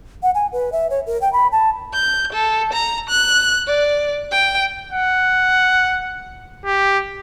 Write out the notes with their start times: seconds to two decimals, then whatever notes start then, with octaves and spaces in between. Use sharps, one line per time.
0.23 F#5
0.35 G#5
0.52 B4
0.72 E5
0.90 C#5
1.06 A#4
1.21 G5
1.33 B5
1.52 A5
1.93 G6
2.32 A4
2.73 A#5
3.09 F#6
3.67 D5
4.31 G5
4.93 F#5
6.65 G4